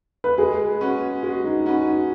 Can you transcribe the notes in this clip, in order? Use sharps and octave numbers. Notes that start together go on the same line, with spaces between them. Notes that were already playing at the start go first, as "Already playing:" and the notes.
B4
G#3 G#4
C#4 F#4 B4
G#3 F#4
D#4
C#4 D#4 F#4 B4